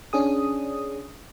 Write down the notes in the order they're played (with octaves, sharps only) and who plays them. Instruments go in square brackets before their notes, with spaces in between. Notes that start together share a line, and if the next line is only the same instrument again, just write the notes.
[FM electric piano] C#4 D4 G#4 D#6